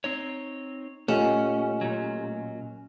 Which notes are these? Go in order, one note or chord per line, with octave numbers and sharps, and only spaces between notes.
C4 D#4 C#5
A#2 A3 C#4 F4 G4 D#5 F#5 E7
A#2 F#3